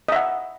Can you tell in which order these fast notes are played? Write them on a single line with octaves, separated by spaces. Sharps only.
D#5 E5 F#5